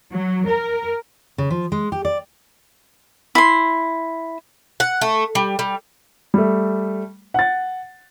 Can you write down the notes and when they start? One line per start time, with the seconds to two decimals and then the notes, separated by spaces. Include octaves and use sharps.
0.13 F#3
0.47 A#4
1.38 C#3
1.50 F3
1.72 G#3
1.92 G4
2.05 D5
3.35 E4 C6
4.80 F#5
5.01 A3
5.35 G3
5.59 G3
6.34 G3 A3
7.34 F#5 A6